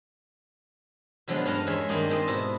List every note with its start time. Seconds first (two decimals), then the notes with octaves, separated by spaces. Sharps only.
1.28 B2 D3 F3 F#3 G#3 B3
1.45 G2 C#4 F5 A5 A#5
1.67 E2 G#3 C#5 E5 G#5 B5
1.89 G2 D#3 A#3 D#4 D5 C6
2.09 G#3 C4 C5 D5 D#5
2.27 G#2 B2 E4 A5